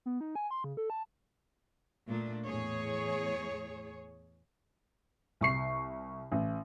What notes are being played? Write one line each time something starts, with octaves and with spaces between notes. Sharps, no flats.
B3
D#4
G#5
C6
C#3
A4
A5
A#2 A3 D4
E2 A2 G#4 C#5
C2 C#6 C7
A1